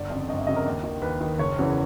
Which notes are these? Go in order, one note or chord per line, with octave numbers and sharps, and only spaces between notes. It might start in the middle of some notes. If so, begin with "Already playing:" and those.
Already playing: G1 D5
F2 C#3
G1 D#5
E5
F2 C#3 D#5
A#4
D#2
D#3
D#2 B4
D#3
F#1 C#5
E2 C#3 E3